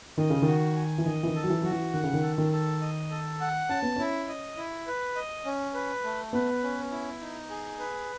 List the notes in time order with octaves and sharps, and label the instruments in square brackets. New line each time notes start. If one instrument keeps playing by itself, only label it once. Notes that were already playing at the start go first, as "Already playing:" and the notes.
[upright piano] D#3 [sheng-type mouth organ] D#5
[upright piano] C#3
D#3
[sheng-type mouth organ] F#4
G#5
[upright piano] E3
[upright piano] D#3 [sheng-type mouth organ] D#5
[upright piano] E3
D#3
[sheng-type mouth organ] A4
[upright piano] F#3
E3
[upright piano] F#3 [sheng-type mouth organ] F#4
[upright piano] E3
[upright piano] D#3 [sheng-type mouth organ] F#5
[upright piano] C#3
D#3
[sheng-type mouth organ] A4
[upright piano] D#3
[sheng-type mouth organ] A4
D#5
A4
F#5
[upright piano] C#4 [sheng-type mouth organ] A5
[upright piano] B3
[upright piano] C#4 [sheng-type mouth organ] E4
[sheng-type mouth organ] D#5
E4
B4
D#5
C#4
B4
A3
[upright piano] B3 [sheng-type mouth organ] B4
[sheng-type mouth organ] C#4
E4
D#4
G#4
B4